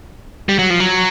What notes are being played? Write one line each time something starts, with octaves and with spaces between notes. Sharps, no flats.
G3
F#3
F3
F#3